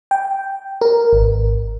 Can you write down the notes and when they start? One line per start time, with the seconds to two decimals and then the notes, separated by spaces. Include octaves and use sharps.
0.11 G5
0.81 A#4
1.13 G#1